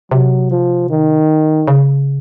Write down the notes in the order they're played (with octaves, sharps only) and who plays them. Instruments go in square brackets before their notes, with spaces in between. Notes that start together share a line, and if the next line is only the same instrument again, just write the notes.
[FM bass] C3 [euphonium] F#3
[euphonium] F3
D#3
[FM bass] C#3